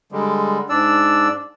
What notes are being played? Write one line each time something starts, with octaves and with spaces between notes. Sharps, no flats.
D3 G3 G#3
G#2 D4 D5 E6